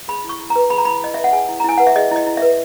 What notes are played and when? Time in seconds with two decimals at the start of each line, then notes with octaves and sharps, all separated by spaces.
0.08 G#4 B5
0.24 E4
0.29 C#6
0.40 E4
0.50 A#5
0.56 B4
0.70 G#4 B5
0.78 A#5
0.85 E4 B5
1.02 E4 D#5
1.14 B4 E5
1.24 F#5
1.33 G#4 G#5
1.49 E4
1.60 A#5
1.64 E4 G#5
1.78 B4 F#5
1.87 E5
1.96 G#4 D#5
2.11 E4 D#5
2.26 E4
2.37 B4 E5